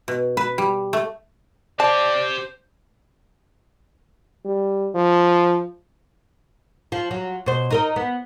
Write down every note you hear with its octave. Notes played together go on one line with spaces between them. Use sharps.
B2
B4
G3
A3
C4 G4 C5 D5 A5
G3
F3
F3
F#3
B2 C5
D#4 A#4 D#5
B3